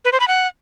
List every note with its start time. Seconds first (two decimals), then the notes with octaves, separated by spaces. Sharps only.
0.05 B4
0.12 C5
0.20 B5
0.28 F#5